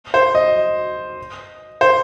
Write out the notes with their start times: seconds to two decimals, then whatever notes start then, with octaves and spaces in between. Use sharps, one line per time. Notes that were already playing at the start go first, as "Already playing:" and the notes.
0.14 C5
0.35 D#5
1.81 C5